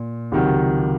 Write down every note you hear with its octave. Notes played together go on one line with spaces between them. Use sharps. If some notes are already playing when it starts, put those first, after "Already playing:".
Already playing: A#2
C#2 C3 D#3 F#3